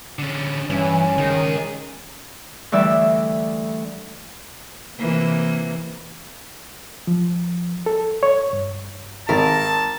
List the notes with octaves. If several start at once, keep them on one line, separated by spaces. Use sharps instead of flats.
D3 C#4
G2 E3 C#4
C#2 D#3 G#4
D2 E3 G3 D5 E5 E6
C3 E3 A#3
F3
A4
C#5
G2
G#1 A#4 A5